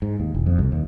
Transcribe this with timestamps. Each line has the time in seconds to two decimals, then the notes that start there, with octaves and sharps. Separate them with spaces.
0.02 G#2
0.20 D#2
0.34 E1
0.46 F2
0.59 C2
0.72 D#2